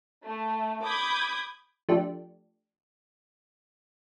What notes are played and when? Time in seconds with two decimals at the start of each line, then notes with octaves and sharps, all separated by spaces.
0.24 A3
0.83 B5 D6 D#6 G6 G#6
1.89 F3 A3 D4 G4